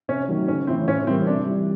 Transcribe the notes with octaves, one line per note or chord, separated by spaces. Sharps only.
C3 C#4
D#3 F#3 A3
C#3 C#4
E3 A3 C4 C#4 E4
A2 C#4
E3 G3 A#3 C4
C3 D4
E3 G3